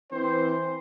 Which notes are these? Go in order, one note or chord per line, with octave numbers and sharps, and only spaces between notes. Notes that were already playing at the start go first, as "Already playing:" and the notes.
E3 C4 C5